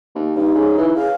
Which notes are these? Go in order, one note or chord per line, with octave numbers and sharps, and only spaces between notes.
D#2
G2 D#4
C#3
E3
C#3 F5